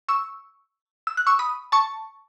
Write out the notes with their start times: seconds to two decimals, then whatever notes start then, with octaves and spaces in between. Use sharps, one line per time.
0.09 C#6 E6
1.07 E6
1.17 F#6
1.27 C#6 E6
1.39 B5 D#6
1.72 A5 C#6